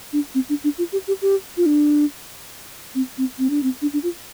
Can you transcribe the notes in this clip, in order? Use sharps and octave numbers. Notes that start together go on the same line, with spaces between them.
D4
C4
D4
D4
F4
G4
G4
G4
F4
D4
C4
C4
C4
D4
C4
D4
D4
F4